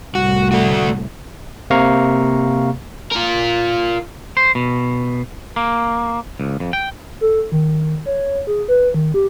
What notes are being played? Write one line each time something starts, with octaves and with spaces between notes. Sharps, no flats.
C2 A2 F#4
A3 F#4
C3 A#3 F5 A#5 C#6
F4 A#4
C5
B2
A#3
C#2
F2
G5
A4
D#3
C#5
G#4
B4
D#3
G4